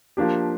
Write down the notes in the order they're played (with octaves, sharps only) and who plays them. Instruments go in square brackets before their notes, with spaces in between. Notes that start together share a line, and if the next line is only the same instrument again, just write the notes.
[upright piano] F3 A#3 D4 G4